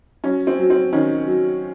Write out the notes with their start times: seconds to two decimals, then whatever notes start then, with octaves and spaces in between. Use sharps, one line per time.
0.24 F#3 C#4
0.47 C4
0.59 F#3
0.70 C4
0.92 D#3 C#4
1.27 F#3